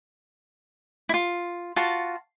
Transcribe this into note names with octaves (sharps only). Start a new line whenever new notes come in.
E4 F4
F4 F#4 A5